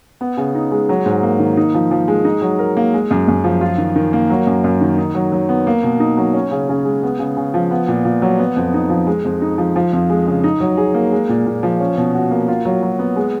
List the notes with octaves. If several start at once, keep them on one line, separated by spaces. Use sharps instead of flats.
B3
C#3
D#4
G#3
F#3
G#2
A#3
D#3
D#4
F3
F3
G#3
D#4
F#3
A#4
A#3
G#3
F#2
F#2
F3
F4
D#3
D#3
A#3
F#3
F#2
F#2
D#3
D#4
F#3
F#3
B3
A#3
B2
D#4
F#3
C#4
C#3
C#3
G#3
B3
C#3
C#3
F3
B3
A#2
A#2
F#3
B3
F2
D#4
F3
G#3
F2
D#4
F3
F3
F2
G#3
C#3
D#4
F#3
G#4
A#3
G#3
A#2
A#2
F3
C#4
B2
F#4
A#3
F4
F#3
F#3
B3
G#3